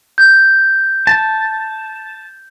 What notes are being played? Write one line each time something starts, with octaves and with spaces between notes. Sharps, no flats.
G6
A5